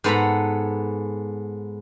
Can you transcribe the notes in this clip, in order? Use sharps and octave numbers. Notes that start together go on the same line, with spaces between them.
G#2 B3 A4 F#5 A#5 B5